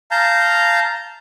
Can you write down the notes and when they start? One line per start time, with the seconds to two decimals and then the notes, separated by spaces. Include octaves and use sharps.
0.11 F5 A5 A#5 G6